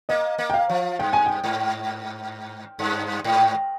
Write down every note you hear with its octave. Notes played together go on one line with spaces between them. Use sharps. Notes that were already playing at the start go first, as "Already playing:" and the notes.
A#3 D#5
A#3
G5
F5
F3
G2 G5
G#5
G5
G#2
G2
G#2